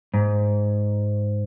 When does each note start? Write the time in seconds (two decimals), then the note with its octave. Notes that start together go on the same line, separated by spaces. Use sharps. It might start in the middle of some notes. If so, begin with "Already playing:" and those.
0.14 G#2